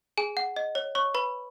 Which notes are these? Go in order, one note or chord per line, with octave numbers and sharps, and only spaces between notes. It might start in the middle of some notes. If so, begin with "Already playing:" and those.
G#4 G#5
F#5
D#5
C#5
C#5 C#6
B4 B5